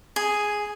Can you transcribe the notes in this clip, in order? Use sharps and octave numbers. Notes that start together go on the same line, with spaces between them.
G#4